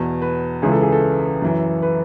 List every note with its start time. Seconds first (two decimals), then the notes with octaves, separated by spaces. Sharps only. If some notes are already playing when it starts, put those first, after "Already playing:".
Already playing: E2 B2
0.22 B4
0.62 C#2 C#3 E3 G#4
0.72 A4
0.82 G#4
0.92 A4
1.42 F#2 E3
1.82 B4